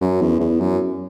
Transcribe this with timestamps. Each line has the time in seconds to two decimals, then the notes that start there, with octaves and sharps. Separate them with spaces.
0.01 F#2
0.21 E2
0.40 E2
0.60 F#2